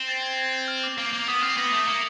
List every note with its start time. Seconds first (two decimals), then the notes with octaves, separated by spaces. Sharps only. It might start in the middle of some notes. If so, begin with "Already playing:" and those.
Already playing: C4
0.08 A6
0.22 G#6
0.37 G#6
0.53 G6
0.68 F6
0.83 D6
0.98 A#3 D6
1.13 A#3 D6
1.28 B3 D#6
1.43 C4 F6
1.57 B3 A#6
1.72 A3
1.88 A#3 C#7